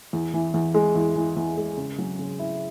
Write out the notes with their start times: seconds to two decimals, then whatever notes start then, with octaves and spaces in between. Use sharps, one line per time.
0.13 E2
0.34 E3
0.54 E2
0.74 G#3
0.95 E2
1.16 E3
1.36 E2
1.57 G#3
1.77 C#3
1.98 F#3
2.19 C#3
2.39 E4